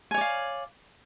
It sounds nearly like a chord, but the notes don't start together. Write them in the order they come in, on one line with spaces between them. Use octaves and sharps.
G#5 C#5 D5 F5